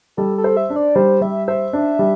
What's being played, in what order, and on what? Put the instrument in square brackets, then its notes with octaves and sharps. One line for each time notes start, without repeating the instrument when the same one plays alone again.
[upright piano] G3 [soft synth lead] A4
[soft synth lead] A4
[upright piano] C5
[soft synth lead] E5
[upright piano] D4
[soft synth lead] D5
[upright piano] G3 [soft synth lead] C5
[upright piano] G3 [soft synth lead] E5
[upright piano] C5 [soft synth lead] E5
[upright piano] D4
G3